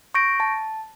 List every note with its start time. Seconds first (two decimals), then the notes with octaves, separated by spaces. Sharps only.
0.14 C#6 G6 A#6 D7
0.40 A5